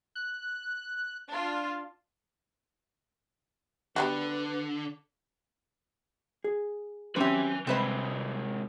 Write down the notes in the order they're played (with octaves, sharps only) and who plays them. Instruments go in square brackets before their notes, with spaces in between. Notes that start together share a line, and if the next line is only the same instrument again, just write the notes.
[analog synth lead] F#6
[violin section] D4 F4
[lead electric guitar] D3 [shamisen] G3 B3 F#4 [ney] B4
[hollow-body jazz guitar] G#4
[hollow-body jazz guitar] F#3 C#4 E5 [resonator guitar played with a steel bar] C4 G4 [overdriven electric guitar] B4 G#5
[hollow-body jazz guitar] C2 C5 B5 [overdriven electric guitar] C3 G#3 [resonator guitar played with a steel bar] C4 B4 D#5